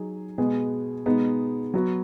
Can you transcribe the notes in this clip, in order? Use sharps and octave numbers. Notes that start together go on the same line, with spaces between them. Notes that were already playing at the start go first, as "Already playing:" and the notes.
Already playing: F#3 D#4 G#4
B2 G#3 B3 G#4
B2 G#3 B3 D#4
F#3 B3 F#4